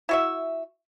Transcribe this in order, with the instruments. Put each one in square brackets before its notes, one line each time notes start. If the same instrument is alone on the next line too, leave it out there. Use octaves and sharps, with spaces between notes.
[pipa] E4 F#4 E5